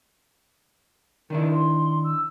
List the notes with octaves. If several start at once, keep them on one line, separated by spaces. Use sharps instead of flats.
D#3 D4 E4 A#4
C6
E6